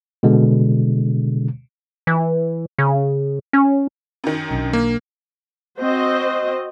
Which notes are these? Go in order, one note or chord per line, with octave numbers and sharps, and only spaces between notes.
B2 D3 G#3
E3
C#3
C#4
F#2 D#3
B1 D4
A#3
C4 F#4 C5 D#5